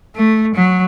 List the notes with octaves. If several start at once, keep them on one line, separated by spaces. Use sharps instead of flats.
A3
F#3